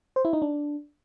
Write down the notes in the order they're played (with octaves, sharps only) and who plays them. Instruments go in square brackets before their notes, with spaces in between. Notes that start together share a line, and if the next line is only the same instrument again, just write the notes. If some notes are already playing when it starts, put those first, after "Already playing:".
[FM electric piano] C5
E4
D#4
D4